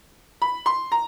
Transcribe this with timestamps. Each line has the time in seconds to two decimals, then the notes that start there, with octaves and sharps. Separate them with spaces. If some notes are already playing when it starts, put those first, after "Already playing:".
0.42 B5
0.66 C6
0.92 A#5